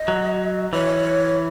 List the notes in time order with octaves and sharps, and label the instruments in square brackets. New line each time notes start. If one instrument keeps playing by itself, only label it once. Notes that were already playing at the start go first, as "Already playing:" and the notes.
Already playing: [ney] D#5
[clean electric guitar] F#3
[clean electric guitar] E3 [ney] C#5